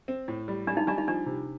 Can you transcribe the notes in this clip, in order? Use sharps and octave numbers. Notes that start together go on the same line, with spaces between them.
C4
A2
G3
G3 D4
D#4
G3 D4
D#4
F3 D4
C3